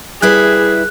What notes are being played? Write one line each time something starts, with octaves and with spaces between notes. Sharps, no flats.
G3 E4 G#4 B4 F#6